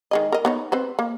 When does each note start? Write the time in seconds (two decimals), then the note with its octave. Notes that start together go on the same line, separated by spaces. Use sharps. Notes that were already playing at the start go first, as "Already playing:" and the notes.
0.11 D#3 G#3 D#5
0.32 A#4 D#5
0.45 B3 D#4 C#5
0.72 C4 B4 C5
0.99 A#3